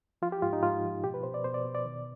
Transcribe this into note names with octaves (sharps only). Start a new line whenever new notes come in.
F3 F4
G4
G#2 F4
D#4
G#2 F4
F3
B2 G4
B4
B2 C5
D5
B2 C5
D5
B2
D5
D#3